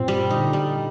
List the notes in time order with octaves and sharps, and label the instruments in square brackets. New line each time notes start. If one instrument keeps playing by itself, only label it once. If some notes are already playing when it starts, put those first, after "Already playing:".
Already playing: [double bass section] G2 A#2 [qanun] C4 F4
[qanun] G3
[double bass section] A#2 D3 [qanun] D#4
[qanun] G3